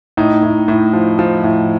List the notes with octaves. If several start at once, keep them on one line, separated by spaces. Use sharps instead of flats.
A2 D#4
A2
A2
F3
F3
A2